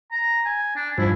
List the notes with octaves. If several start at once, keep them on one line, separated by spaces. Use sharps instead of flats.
A#5
G#5
D4
G2 F3 E4